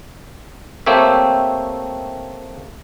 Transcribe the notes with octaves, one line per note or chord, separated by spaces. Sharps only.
A3 A#3 C4 G4 C#5 E5